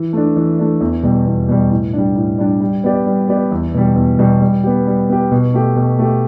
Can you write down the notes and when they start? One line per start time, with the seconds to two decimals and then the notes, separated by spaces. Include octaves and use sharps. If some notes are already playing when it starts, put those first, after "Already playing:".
Already playing: E3
0.13 A3 D4
0.36 E3
0.59 A3 D4
0.81 E2
1.03 B2 G3
1.26 E2
1.48 B2 G3
1.71 A2
1.93 G3 D4
2.15 A2
2.38 G3 D4
2.60 G3
2.84 B3 G4 D5
3.06 G3
3.29 B3 G4 D5
3.51 E2
3.74 B2 G3
3.96 E2
4.19 B2 G3
4.42 G3
4.64 B3 G4
4.87 G3
5.09 B3 G4
5.31 B2
5.54 A3 G4
5.76 B2
5.99 A3 G4